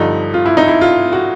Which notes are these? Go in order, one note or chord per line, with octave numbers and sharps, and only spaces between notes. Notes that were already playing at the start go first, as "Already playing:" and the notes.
Already playing: G2 D3 F3 D#4
F4
E4
D#4
E4
F4
F#4